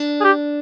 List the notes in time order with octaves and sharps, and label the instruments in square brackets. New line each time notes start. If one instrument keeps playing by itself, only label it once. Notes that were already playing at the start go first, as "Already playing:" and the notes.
Already playing: [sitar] D4
[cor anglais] G#4
G4